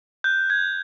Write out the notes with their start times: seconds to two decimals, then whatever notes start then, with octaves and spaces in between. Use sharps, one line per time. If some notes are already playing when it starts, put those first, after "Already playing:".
0.24 F#6 G6
0.50 F#6 G#6